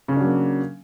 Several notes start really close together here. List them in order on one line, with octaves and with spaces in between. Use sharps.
C#3 C#4 D4 F#3 A#3